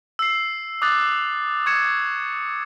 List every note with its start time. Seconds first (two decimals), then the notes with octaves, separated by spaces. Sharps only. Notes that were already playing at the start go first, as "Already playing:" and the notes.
0.19 E6 C7
0.82 D6 D#6 F#6 A6
1.66 C#6 G#6 C#7 E7